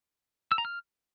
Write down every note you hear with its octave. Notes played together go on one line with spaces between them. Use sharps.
E6
A#5
F6